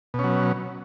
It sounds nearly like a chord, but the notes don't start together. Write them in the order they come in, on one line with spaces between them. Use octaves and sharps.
B2 C#4 F#3